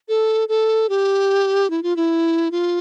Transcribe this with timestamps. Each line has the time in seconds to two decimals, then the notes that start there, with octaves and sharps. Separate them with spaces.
0.09 A4
0.49 A4
0.89 G4
1.70 E4
1.83 F4
1.96 E4
2.51 F4